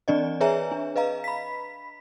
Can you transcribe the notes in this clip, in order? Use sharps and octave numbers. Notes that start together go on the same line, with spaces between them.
E3 C4 D4 D5 D#5
G#4 B4 C#5 E5 G#5 A#5
D4
B4 D#5 F5 A#5
B5 B6